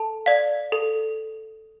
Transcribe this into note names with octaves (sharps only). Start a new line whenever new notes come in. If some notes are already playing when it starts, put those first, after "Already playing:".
Already playing: A4 A5
D5 F5
A4